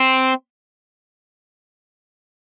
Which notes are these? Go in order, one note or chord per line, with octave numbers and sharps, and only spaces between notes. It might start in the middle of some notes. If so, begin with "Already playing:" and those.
Already playing: C4